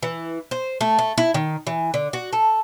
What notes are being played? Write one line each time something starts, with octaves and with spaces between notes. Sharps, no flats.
E3
C5
A3
A3
E4
D#3
E3
D3
F#4
A4